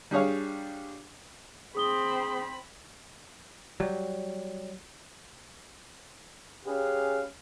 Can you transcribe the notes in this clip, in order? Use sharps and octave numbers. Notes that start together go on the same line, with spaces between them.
G3 D4 G#4 C#5 F5
C4 G#4 B5 D#6 G7
F#3 G3
C#4 G4 G#4 B4 F5